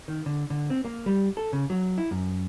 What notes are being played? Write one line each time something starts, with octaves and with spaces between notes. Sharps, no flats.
D#3
D3
D3
C4
A#3
G3
A4
C#3
F#3
E4
F#2